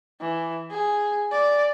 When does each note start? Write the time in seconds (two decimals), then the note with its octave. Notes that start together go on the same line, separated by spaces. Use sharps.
0.21 E3
0.70 G#4
1.31 D5